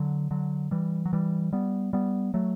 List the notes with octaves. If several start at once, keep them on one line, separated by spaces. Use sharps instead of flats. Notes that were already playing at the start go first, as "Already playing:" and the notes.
Already playing: D3 F#3
D3 F#3
E3 G3
F#3
E3 G3
G3 B3
G3 B3
F#3 A3